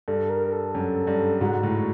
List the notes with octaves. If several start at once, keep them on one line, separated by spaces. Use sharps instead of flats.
G2 A4
A#4
A4
F#2
G2
G#2 F#4
A2